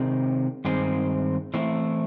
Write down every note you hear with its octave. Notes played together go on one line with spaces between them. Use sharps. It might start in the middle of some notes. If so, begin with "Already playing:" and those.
Already playing: C3 D#3 G#3 C4
G2 D#3 G#3 C4
E3 A3 C4 E4